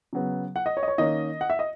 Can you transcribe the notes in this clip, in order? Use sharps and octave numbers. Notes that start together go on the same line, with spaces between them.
C#3 F#3 B3
F#5
D#5
C#5
D#5
C#5
D#3 A#3 C#4 D#5
F#5
E5
D#5